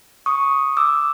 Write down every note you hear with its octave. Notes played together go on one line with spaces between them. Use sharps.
C#6 D#6
D6 E6